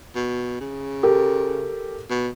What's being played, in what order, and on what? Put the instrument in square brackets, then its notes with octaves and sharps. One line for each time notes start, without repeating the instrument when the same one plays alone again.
[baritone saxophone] B2
C#3
[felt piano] G4 A4 A#4
[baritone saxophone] B2